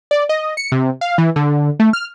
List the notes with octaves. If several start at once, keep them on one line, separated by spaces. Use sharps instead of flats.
D5
D#5
C#7
C3
F5
E3
D3
A3
F6